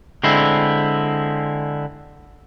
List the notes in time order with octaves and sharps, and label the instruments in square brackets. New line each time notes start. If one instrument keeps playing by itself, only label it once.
[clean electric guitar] D3 G#3 C4 E4